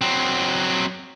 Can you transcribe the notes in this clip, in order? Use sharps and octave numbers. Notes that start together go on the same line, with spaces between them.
F#3 C4